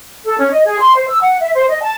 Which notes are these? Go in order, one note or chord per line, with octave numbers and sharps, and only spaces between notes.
A4
C#4
D#5
G#4
C6
C5
E6
F#5
E5
C5
D#5
A5